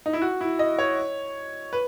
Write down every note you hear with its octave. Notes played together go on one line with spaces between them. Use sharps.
D#4
E4
F#4
E4
D#5
C#5
B4